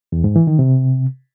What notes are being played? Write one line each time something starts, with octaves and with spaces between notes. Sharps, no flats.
E2
G#2
E3
D#3
C3